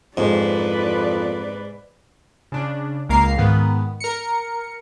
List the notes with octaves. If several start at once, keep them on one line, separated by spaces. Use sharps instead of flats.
F2 G#2 B4 D5
C#3 D4
C#2 A#3 A#4 F5 C7
G#2 D#3 B3
A#4 C#7